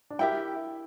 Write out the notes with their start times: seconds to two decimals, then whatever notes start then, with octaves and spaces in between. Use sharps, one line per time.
0.10 D4
0.19 E4 G4 A#4 E5 G5